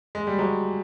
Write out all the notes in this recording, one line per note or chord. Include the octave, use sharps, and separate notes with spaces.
G#3
G3
F#3 G#3